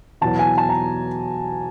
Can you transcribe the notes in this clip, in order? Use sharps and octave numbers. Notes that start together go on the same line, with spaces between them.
E2 B2 F#3 A5
G#5
A5
A#5